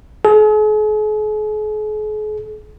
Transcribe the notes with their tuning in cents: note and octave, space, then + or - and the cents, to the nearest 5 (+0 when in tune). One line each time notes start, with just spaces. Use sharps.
G#4 +45